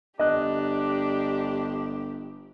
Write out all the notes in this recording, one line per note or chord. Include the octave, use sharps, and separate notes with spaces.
G1 D4 G4 D#5 F#6